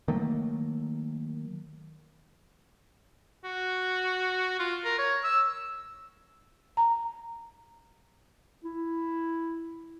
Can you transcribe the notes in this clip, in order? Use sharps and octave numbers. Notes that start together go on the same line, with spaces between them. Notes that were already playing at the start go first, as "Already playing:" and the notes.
D#3 F#3 A3 A#3
F#4
F4
A#4
C#5
E6
A#5
E4